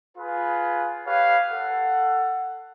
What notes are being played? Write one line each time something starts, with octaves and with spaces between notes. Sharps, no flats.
F4 G#4 B4
G4 B4 C#5 F5
A4 F#5